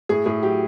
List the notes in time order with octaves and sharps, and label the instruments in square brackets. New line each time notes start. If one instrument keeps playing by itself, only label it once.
[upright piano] A2 G#4
A2 G#4
F#3 G4